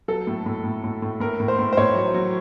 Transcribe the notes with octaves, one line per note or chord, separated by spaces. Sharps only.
F#3 A4
A2
A2
A2
A2
A2
A2 A#4
A2
C5
A2
C5
A2 C#5
F#3
F#3